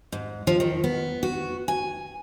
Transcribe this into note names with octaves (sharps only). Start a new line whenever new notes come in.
G#2
F3
D#3
B3
F#4
G#5